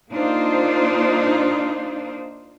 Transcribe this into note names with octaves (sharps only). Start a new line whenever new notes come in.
A#3 D4 D#4 F4 C5